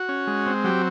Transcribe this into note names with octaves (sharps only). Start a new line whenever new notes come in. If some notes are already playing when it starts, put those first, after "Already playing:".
Already playing: F#4
C#4
G#3
C4
F#3 G4